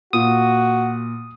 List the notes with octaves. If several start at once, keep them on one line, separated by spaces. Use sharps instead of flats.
A#2 F#4 D#6